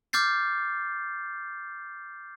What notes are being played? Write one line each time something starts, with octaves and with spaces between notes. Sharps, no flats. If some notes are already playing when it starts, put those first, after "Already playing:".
D6 F6 G6 A6 C7